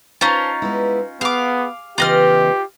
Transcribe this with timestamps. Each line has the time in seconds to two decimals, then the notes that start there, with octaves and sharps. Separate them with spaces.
0.21 C#4 D#4 F4 C5 A5
0.62 G#3 B3 E4
1.21 B3 G#4 F5 D6
1.98 E2 C#3 E3 F4 G4 D#5 F6